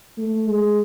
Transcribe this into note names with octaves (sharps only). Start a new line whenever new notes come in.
A3
G#3